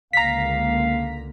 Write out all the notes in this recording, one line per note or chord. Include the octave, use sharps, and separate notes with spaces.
C#2 D3 A#3 F5 A#5 B6